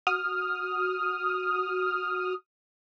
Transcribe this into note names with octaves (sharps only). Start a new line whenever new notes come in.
F#4 D#6 F6